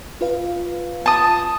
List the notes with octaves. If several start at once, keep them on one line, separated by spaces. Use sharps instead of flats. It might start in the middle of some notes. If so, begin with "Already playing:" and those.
F4 B4 F5
A5 D#6